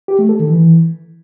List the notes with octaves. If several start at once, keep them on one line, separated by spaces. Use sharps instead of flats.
G4
A3
A4
D#3
E3